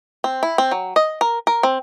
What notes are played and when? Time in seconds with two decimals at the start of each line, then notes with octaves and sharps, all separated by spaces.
0.24 C4
0.43 E4
0.58 C4
0.71 F#3
0.96 D#5
1.21 A#4
1.47 A#4
1.63 C4